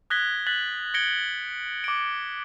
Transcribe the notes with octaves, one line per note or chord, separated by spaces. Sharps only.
D#6 F#6 G#6 A#6 B6 G7
F#6 A6 B6 F#7
G#6 A#6 C#7 D7 G7
D6 D7